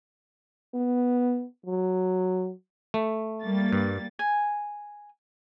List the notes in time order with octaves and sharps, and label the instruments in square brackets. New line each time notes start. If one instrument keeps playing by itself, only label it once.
[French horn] B3
F#3
[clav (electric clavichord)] A3
[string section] G3 A#3 A6
[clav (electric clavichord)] G2
[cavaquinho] G#5